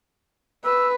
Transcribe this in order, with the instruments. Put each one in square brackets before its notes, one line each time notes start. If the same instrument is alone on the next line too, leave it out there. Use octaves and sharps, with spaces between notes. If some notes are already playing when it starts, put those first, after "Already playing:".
[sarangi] B4 [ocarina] E6